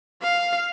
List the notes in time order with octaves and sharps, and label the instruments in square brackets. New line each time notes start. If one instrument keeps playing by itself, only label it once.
[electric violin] F5